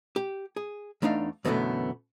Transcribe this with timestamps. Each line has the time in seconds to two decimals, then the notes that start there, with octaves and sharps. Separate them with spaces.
0.16 G4
0.56 G#4
1.02 E2 A3 D4 D#4 F5
1.45 F#2 B2 D3 E3 A3 B3